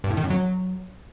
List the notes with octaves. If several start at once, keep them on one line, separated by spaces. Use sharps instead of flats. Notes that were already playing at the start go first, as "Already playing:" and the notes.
G2
A2
D#3
F#2
F#3